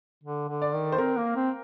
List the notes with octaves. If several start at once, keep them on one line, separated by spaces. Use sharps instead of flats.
D3
D3
D5
D#3
C5
C4 A#4
A#3
C4